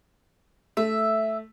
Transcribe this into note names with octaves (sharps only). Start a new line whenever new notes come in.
A3 E5